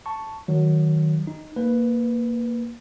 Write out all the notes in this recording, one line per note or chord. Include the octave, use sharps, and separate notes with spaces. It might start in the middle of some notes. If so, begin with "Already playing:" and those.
A5 C#6
D#3 F#3
D#4
A#3 B4